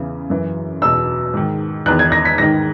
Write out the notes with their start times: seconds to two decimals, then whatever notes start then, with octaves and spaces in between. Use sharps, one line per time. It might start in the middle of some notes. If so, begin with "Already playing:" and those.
Already playing: E2 C#3 E3
0.30 F#2 E3
0.82 E2 B2 E6
1.34 G#2 D#3
1.86 E2 D#3 F#6
1.99 G#6
2.12 A#6
2.25 B6
2.38 G#2 D#3 A#6